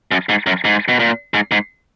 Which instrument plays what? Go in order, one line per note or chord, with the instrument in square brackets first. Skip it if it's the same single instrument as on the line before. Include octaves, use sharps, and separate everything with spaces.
[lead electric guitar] F#2
G#2
F#2
G#2
B2
A#2
G#2
G#2